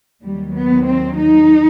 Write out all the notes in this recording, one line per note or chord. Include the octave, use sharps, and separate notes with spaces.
D#2 D#3 F#3 G3
B3
C4
D#4